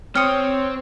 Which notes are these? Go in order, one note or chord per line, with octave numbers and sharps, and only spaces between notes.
C4 G4 C5 C#5 D#6 F6 C#7